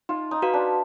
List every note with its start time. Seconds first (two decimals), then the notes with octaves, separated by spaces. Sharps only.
0.09 D#4 F4
0.31 D#4
0.42 F#4 B4 F5
0.53 D4